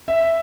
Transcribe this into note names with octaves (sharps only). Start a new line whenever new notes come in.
E5